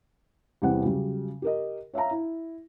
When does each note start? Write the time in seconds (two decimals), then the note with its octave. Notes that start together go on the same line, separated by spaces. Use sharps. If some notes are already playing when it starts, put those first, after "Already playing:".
0.62 E2 C3 E3 G3 C4 F#5
0.83 C#3 F#3 G3
1.42 G4 A#4 D#5
1.94 C#5 E5 F5 A#5
2.11 E4